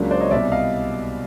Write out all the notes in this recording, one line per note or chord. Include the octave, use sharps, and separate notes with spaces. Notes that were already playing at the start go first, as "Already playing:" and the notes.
Already playing: C#2 C#3 F#3 A#3 D4
C5 D5
C#5 D#5
C2 B2 G3 D5 E5
D#5 F5